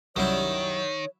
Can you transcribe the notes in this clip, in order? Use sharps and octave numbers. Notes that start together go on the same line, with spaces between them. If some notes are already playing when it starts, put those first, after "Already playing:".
C2 F#2 D#3 F#3 G3 E4 C#5